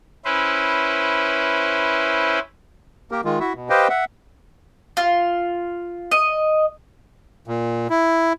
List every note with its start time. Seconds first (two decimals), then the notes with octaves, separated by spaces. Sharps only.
0.25 C#4 E4 B4 C5
3.11 A#3 G4 A#4
3.25 D#3 G#3 F4
3.40 E4 F#4 E5
3.55 B2
3.70 G4 B4 C5 D#5 F5 G5
3.89 E5 F#5
4.97 F4
6.12 D#5
7.48 A#2
7.90 E4